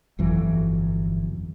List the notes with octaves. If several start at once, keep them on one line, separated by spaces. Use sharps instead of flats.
G1 F2 E3 F#3